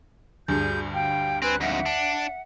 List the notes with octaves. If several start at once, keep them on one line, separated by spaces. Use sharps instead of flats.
D2 G2 G#4 G6
F5 G5
C4 B4 G#5 F#6
F2 G#2 E5 F#5
D4